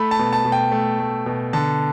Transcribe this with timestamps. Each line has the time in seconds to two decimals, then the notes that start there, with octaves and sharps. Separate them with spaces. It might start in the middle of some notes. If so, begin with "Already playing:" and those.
Already playing: A3 B5
0.11 A5
0.19 B2
0.33 A5
0.45 B2
0.52 G5
0.72 A3
1.00 A3
1.26 B2
1.53 D3 A5